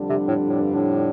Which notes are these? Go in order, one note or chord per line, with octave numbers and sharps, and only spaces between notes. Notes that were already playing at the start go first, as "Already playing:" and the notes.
Already playing: F2 D3 G3 D4
C3
A2
A2
G2
A2